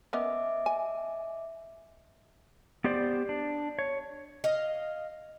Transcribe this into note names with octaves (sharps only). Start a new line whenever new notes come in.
B3 C#4 A#4 D#5 E5 D6
G#5
B3 G4 C5 D5
D4
C#5
D#5 F5